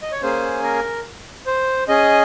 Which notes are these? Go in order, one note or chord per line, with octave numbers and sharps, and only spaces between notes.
D#5
C#5
A#3 C#4 G#4 C5
A#4
C5
C#4 G#4 D#5